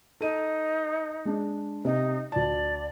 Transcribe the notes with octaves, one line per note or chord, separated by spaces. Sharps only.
D#4 A4 D#7
G#3 D4
C3 D#4
D2 D5 A5